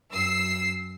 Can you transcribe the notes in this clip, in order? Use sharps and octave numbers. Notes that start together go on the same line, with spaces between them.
F#2 E6 C7